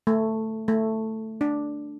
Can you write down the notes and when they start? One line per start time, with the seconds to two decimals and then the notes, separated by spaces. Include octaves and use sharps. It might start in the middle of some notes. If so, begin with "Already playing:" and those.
0.07 A3
0.68 A3
1.41 D4